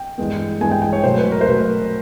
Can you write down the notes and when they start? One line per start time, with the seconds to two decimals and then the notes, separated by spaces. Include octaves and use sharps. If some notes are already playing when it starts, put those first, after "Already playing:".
Already playing: G5
0.18 G2 E3 G#3 B3
0.61 G2 E3 G#3 B3 G#5
0.71 G5
0.82 G5
0.93 C#5
1.04 B2 F#3 A3 C5
1.18 B4
1.32 A#4
1.41 C5
1.46 B2 F#3 A3 B4